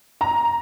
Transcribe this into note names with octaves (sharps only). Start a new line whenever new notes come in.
A#5